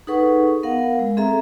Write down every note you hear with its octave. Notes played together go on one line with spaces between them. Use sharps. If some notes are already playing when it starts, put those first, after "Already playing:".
D#4 G#4 A4 B4 F#5 C#6
B3 A#4 F5 F#5
G#3
C4 G#4 A4 E5 A#5